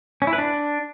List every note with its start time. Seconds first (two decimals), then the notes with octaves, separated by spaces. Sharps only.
0.22 C#4
0.27 E4
0.33 B4
0.38 D4